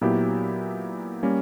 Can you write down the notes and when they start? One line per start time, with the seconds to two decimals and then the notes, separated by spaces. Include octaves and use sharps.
0.01 A#2 F#3 B3 E4 G4
1.23 G3 A#3 C#4